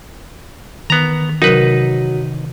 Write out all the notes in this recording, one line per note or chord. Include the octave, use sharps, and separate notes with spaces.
D#3 B3 A#5
C3 F#3 D#4 A#4 B4